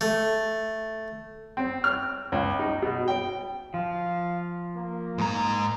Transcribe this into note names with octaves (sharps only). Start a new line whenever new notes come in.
A3
C4
F6
C#2
D#4
B2
G5
F3 F5
A#3
G#2 A#5